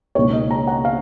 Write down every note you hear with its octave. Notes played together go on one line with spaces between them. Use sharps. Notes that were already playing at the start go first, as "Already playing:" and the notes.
C#2 B2 A#3 D#4 C#5
D#5
A#5
F#5
F5